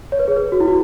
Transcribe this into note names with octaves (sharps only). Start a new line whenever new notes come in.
C#5
B4
G#4
B4
F#4
E4
F#4